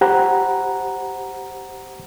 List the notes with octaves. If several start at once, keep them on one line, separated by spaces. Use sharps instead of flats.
G4 C5 F#5 A#5 B5